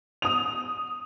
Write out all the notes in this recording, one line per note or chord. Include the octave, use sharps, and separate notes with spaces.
D#6 F7